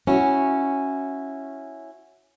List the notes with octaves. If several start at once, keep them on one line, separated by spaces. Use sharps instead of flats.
C#4 E4 F#4